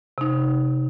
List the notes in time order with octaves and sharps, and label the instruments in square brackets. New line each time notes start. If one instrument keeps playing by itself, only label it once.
[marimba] C3 D#4